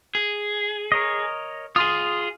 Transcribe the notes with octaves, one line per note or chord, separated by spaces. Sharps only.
G#4
A#4 C#5 D#5
F4 G#4 C6 D#6